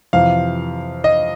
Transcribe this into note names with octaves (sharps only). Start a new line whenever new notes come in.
F2 C3 E3 F5
D#5